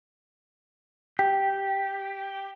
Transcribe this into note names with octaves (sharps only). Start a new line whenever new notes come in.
G4 G5